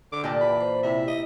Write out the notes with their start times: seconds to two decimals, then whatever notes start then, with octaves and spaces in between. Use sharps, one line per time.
0.12 D3 D6
0.24 A#2 G4 D5 A5
0.41 E3 B5
0.61 C5
0.83 C3 E4 E5
1.07 D#5